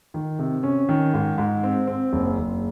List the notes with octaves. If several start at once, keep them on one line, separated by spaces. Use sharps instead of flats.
D#3
C3
C#4
D#3
G#2
G#2
C4
C4
F#1
F#1